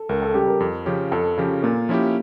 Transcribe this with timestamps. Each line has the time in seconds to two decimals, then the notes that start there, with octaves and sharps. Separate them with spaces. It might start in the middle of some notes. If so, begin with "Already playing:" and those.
Already playing: A4
0.09 C#2 A#4
0.22 A4
0.34 C#3 G3 G4
0.47 A#4
0.60 F2
0.86 C#3 F3 C#4 G4
1.12 F2 A4
1.38 C#3 F3 C#4 G4
1.62 A#2 A#3
1.89 F3 C#4 E4 G4